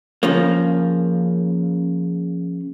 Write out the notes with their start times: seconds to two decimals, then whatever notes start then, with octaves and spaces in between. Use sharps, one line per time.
0.23 C#3 F3 A#3